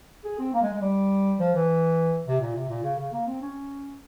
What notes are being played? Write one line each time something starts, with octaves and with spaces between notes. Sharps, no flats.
G#4
C4
A#3
G#3
G#3
G3
F3
E3
C3
A#2
C3
A#2
C#3
C#3
A#3
C4
C#4